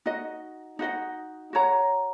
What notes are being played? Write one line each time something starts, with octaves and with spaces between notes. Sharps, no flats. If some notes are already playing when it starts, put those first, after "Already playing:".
D#4 F#4 D#5
D#4 F#4 D#5 F#5
F#4 C#5 F#5 A#5